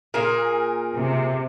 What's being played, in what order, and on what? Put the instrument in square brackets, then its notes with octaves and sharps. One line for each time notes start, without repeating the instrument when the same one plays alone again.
[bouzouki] A#2 G#4 [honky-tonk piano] A#4
[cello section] C3